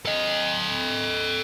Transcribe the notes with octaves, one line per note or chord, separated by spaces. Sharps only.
A4 D#5